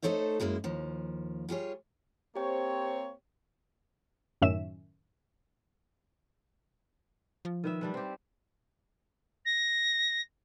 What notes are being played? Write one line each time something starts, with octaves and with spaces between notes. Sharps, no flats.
A3 D#4 A4 C5 C#5 E5
F#2 G#3 A#3 E4
D#2 F3
G3 F4 G#4 C#5
A#3 C4 G4 C5 C#5 G5
F#2 A2 D#3 C#4 E5 E7
F3
D#3 B4 E5
G3 D4 B4
C4 G4
A#6